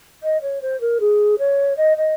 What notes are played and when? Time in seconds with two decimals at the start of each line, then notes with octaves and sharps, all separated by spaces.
0.23 D#5
0.41 C#5
0.61 C5
0.80 A#4
1.00 G#4
1.38 C#5
1.77 D#5
1.97 D#5